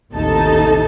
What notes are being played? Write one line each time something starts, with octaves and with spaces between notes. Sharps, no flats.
A1 D#2 C3 D#4 A4 A5